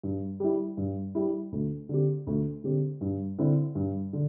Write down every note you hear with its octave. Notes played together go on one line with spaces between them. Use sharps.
G2
G3 E4
G2
G3 E4
D2
D3 C4 G4
D2
D3 C4 G4
G2
D3 C4 E4
G2
D3